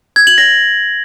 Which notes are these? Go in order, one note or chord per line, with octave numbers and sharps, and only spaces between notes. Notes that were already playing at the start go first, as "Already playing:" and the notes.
G#6
F#7
A#6